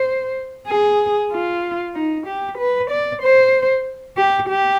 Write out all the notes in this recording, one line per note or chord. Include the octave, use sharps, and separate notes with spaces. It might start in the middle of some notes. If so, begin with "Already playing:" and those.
Already playing: C5
G#4
F4
D#4
G4
B4
D5
C5
G4
G4